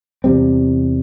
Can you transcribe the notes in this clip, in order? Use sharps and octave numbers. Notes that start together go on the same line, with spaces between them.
E2 C3 G3 C4